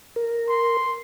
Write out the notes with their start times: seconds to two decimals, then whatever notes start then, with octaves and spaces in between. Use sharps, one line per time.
0.16 A#4
0.49 C6